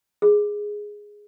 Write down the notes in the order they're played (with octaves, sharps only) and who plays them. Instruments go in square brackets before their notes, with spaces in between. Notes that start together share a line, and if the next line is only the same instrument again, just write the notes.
[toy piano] G#4